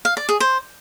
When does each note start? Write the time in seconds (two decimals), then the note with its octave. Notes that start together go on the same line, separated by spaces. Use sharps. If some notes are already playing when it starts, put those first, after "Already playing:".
0.05 F5
0.17 D5
0.29 G#4
0.40 C5